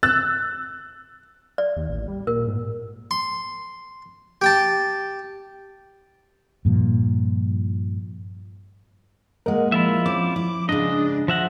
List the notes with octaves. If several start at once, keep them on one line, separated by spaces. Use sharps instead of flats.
E6 F#6 A6
D5
D#2
A1
G3
A#2 A#4
G#2
C6
G4 G5 A5
G2 A#2 F3
A#2 G#3 A#4 D#5 F#5
F3 E4 F4 E5
C4 C#4 D6
E4
G#2 C#3 D4 D#5
F3 E5 F#5 A#6